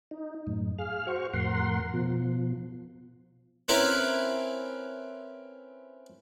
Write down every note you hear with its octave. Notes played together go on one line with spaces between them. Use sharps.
D#4
F#2 A2
G#4 F5 F6
F#4 C5 C#6
F2 A2 A#4 F#5 C6
B2 F3
C4 C#4 E4 A#4 B4